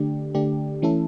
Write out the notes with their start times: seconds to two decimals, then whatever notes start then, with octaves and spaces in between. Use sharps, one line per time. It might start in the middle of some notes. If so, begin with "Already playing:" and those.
Already playing: D3 A3 D4 G4
0.34 D3 A3 D4 G4
0.82 E3 A3 C#4 E4 A4